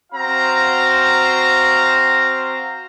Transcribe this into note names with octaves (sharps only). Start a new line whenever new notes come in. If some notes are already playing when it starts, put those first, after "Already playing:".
C4 F#4 C5 F5 A#5